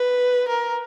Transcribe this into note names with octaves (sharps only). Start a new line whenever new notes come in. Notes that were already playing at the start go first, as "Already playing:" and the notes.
Already playing: B4
A#4